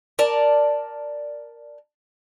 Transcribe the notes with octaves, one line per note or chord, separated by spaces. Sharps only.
A#4 D5 A5